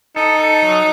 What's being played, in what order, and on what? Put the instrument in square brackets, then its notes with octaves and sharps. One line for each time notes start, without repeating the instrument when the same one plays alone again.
[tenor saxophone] D#4 [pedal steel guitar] A4
[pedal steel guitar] A4
F#3